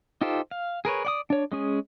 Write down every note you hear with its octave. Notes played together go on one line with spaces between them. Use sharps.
D#4 F4 G4 A4 C5
F5
G#4 A#4 B4 C#5
D5 F#5 D#6
D4 C#5
G#3 C#4 G#4